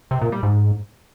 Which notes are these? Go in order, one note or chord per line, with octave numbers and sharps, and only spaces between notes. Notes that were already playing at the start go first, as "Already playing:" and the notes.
C3
A#2
G3
G#2